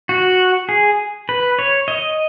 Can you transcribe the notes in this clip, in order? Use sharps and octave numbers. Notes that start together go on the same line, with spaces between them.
F#4
G#4
B4
C#5
D#5